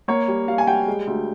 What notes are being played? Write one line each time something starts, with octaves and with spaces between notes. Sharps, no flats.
A#3 C#5
G3
G3 F5
G#5
G3 G5
G#3
D2